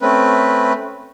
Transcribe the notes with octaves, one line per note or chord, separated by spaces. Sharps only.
A3 C4 C#4 B4